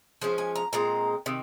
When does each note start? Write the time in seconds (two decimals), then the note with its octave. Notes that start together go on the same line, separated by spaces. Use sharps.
0.21 F3 G#3 C#4 C5
0.38 G#5
0.55 A#5
0.73 A#2 G#3 C4 A#5
1.26 C3 D#3